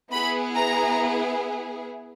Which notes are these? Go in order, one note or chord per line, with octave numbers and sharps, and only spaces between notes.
B3 E4 G#4 B5
A#5